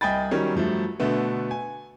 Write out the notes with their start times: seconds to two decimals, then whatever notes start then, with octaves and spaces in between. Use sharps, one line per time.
0.01 C2 D#5 G5 G#5 B5 A6
0.31 D#3 F#3 G3 C#4
0.55 G2 F3 F#3 A3
1.00 B2 D3 A3 B3
1.51 G#5